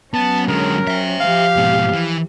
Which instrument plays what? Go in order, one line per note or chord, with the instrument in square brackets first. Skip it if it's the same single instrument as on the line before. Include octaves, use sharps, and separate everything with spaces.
[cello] F#3 C#4 [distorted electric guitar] B3 [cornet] A5
[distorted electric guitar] D3 G#3 [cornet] A#4
[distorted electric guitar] C5 E5
[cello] F3 G4 [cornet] F5
[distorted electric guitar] G#2 B2
E3